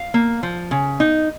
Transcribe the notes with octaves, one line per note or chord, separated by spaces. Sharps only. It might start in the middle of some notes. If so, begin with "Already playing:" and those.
Already playing: F5
A#3
F3
C#3
D#4